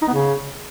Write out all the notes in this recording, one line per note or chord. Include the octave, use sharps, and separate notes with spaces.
D#4
B3
C#3